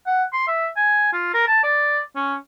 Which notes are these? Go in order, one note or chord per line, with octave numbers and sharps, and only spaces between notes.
F#5
C6
E5
G#5
F4
A#4
A5
D5
C#4